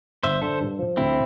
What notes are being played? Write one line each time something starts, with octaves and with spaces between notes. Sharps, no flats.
G1 C5 E5
D3 A4 C5
G2
F3
D2 C4 E4